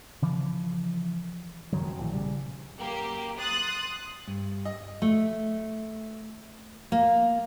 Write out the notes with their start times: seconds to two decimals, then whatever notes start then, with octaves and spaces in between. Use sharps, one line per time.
0.22 C#3 E3 F3
1.72 E1 F#2 D#3 F#3
2.00 A#1 A2 E3
2.13 A#1 C#3 G3
2.76 F#2 A#3 G4
3.37 C6 D#6 F#6 A6
4.27 G2
4.65 D#5
5.02 A3
6.92 A#3